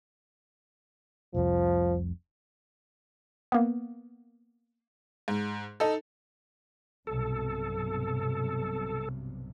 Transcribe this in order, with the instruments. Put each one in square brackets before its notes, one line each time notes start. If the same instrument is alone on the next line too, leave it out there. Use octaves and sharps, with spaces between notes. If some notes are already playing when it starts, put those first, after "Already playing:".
[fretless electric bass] F1 C2 F2 [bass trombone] F3
[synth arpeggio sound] A#3 B3
[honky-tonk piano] G#2
D#4 A4
[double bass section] B1 G2 C3 [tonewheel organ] A4